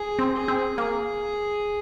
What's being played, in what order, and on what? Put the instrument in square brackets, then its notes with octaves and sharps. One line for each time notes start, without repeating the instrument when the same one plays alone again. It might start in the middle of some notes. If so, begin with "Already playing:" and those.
Already playing: [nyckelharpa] G#4
[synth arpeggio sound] C4
[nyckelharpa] G#4
[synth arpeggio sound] C4
[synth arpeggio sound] A#3 [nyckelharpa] G#4